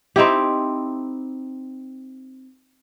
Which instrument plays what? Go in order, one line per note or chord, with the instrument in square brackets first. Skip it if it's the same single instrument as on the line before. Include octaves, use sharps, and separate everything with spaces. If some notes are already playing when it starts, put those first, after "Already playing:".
[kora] C4 D#4 E4 G4